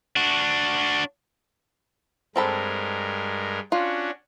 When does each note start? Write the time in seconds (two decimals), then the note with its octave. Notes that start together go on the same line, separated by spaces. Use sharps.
0.16 D4 F#4
2.36 G2 G#3 C4 A4 A#4 B5
3.72 C#4 D4 F4 F#4